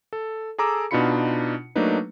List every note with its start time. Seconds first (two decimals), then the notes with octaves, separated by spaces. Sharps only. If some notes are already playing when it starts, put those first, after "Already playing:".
0.13 A4
0.58 G#4 A4 A#5 D6 E6
0.91 B2 D4 D#4 F4 B5 C#7
1.75 F#3 A3 A#3 D4 D#4 B4